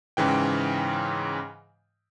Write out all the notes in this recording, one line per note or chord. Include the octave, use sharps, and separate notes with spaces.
G#2 C#3 E3 G5